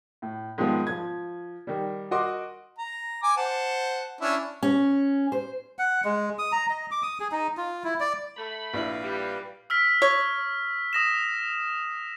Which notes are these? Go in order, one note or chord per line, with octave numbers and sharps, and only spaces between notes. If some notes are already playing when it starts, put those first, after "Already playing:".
A2
G#2 D#3 F3 G#3 B3
F3 G#6
D#3 G3
F#4 A#4 D#5 C6 D6
A#5
G#5 D6
C5 F#5 A5
C#4 D4 E4
C#4
C5
F#5
G#3
D#6
A#5
D#5
D6
D#6
G#4
D#4
F4
E4
D5
A3 B5
A#1 E4 B4 F5
G3
E6 F6 B6
C#5
D#6 A#6 E7